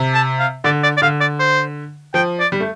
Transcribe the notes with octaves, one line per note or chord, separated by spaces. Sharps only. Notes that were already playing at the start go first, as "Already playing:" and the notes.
Already playing: C3
A5
F5
D3 D5
D5
D5
D3 F5
D5
C5
F3 G5
D5
G3
A3